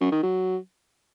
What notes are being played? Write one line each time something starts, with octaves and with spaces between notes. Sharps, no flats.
F#2
D#3
F#3